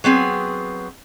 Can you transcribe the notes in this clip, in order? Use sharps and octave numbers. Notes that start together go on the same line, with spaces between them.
F#3 B3 C4 G#4